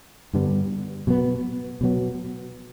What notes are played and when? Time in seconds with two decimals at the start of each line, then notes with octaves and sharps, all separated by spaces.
0.34 G2 D3 G3 B3
1.07 B2 F#3 B3
1.81 B2 F#3 B3